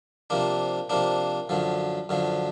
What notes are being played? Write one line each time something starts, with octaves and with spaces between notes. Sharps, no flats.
C3 F3 A#3 D4
C3 F3 A#3 D4
F#2 D3 F3
F#2 D3 F3